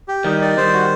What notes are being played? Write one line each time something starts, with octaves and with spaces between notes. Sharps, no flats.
G4
D#3 G3 D#4
D5
D#3 G3 C5
F#4